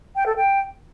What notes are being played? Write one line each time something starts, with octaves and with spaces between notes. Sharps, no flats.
G5
A4
G5